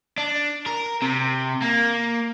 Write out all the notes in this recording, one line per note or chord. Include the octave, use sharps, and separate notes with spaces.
D4
A#4
C3
A#3